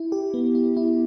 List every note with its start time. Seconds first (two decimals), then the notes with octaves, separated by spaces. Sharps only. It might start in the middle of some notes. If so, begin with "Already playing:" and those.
Already playing: E4
0.12 G4
0.34 B3
0.55 E4
0.77 E4